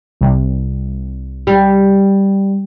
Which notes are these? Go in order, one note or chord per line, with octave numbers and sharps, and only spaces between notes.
C2
G3